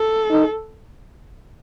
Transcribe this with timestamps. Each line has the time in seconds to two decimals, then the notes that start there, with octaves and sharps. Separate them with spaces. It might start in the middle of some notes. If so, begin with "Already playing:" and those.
Already playing: A4
0.30 D#4